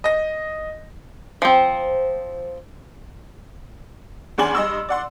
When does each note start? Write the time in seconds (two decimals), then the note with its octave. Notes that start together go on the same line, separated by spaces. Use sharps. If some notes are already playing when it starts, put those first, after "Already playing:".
0.04 D#5 A#6
1.42 F3 C4
4.38 E2 C#3 D4 G#5 C6 F#7
4.55 G2 D#5 C6 E6
4.89 D5 F#5 C6